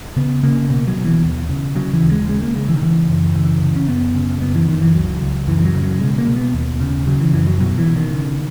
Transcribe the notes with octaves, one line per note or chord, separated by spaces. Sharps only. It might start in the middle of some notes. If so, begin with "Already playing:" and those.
C#3 B3
C#3 A#3
B2 A#3
F#3
B2
E3
D#2
C#3
C#3 F#3
E3
D#2
G#3
C#3 G#3
A#3
C#3 G#3
E3
D#3
C#3 E3
F#2
C#3 E3
C#3
C#4
F#2 B3
C#3
F#2 B3
E3
F#2 D#3
E3
C#2 F#3
C#2
F#2 E3
E3
F#3
C#3
F#3
B2 G#3
A#3
B2
B3
D#2
C#3
C#3 F#3
E3
F#2 E3
F#3
B2 F#3
E3
B2
D#3
C#3